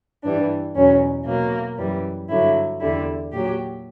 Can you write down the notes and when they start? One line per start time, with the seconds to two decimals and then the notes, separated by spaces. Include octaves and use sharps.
0.24 G2 E3 G3 D4
0.75 E2 B2 F#3 C#4
1.26 B2 F#3 A#3
1.78 F#2 E3 G3
2.29 G2 D3 F#3 E4
2.80 E2 D3 G3 E4
3.32 A#2 F#3 G4